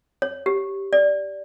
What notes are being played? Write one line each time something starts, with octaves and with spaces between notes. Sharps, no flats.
C#5
G4
D5